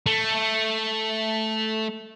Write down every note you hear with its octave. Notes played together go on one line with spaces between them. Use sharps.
A3